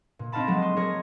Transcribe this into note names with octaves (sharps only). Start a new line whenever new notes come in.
A#2
C4 D#4 F4 F5 A5 B5
F3 F#3 G#3 A3
C6 D#6
D#4 G#4 A#4 C#5